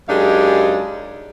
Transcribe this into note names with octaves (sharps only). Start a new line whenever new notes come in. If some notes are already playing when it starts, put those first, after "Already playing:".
F#2 G#3 D4 D#4 G4 F5